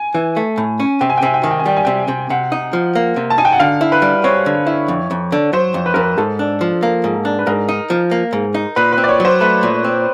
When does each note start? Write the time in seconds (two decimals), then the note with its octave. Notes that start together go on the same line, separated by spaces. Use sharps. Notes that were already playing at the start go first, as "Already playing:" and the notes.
Already playing: G#5
0.15 E3
0.37 A3
0.58 A2
0.80 C#4
1.01 C3 G5
1.10 G#5
1.18 G5
1.23 C3 G#5
1.34 G5
1.43 D#3 G#5
1.51 G5
1.59 G#5
1.66 G3 G5
1.77 G#5
1.85 C3 G5
2.08 C3
2.30 C3 F#5
2.52 D#4
2.73 F3
2.95 A#3
3.16 C3
3.30 A5
3.38 D#4 G#5
3.45 G5
3.52 F#5
3.60 D3 F5
3.81 E4
3.92 B4
4.02 G3
4.24 C4 C#5
4.46 D3
4.67 E4
4.88 F2
5.11 F2
5.32 D3
5.53 F#3 C5
5.74 F2
5.86 B4
5.94 F2 A#4
6.01 B4
6.18 G#2 A4
6.39 D4
6.61 F3
6.83 A#3
7.04 G#2
7.25 D4
7.39 B4
7.47 G#2 A#4
7.69 D#4
7.90 F3
8.11 A#3
8.33 G#2
8.54 D#4
8.76 A#2 B4
8.93 B4
8.98 C4
9.04 D5
9.09 C#5
9.20 F#3 C5
9.41 A3 B4
9.63 A#2
9.84 C4